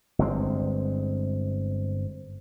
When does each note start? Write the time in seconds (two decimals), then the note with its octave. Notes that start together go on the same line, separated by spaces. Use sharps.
0.19 G1 G#3 C4